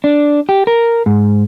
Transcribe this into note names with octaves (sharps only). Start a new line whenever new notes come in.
D4
G4
A#4
G#2